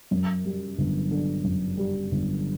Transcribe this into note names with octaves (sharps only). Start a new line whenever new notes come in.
F#2
G3
G1
D3
F#2
G3
G1